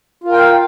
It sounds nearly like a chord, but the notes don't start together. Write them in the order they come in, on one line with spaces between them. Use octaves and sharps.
F4 A#4 G5 F5